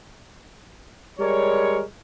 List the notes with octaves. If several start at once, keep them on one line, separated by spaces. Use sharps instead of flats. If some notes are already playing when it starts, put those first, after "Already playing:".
G3 G#3 A#4 C#5